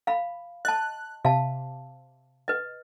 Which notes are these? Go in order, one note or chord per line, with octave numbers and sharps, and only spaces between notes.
F5 B5
D#5 A5 F#6
C3 F5 A5
B4 D#5